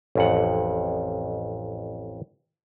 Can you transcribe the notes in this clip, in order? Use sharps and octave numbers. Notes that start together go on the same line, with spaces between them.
A1 F2 F#5